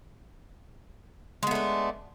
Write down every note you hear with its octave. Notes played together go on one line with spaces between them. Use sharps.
G#3 A3 B3 D4